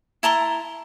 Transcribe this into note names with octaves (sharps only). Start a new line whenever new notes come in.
E4 A5 A#5 C6